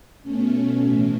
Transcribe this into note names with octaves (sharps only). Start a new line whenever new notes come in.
B2 A3 C#4
A2 E3 A3